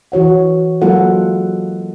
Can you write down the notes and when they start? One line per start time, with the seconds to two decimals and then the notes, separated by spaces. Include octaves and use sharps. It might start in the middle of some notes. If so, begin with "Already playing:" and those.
0.12 E3 F#4 C#5 F#5
0.82 F#3 G#3 A#3 F4 A4 F#5